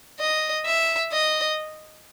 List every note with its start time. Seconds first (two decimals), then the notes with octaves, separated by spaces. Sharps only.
0.20 D#5
0.66 E5
1.12 D#5